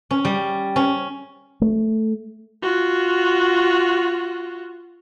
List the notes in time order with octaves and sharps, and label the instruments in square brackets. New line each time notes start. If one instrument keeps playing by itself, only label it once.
[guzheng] C#4
G3
C#4
[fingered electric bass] A3
[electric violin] F4 F#4